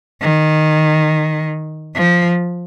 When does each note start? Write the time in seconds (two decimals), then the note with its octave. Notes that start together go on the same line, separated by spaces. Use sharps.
0.21 D#3
1.95 F3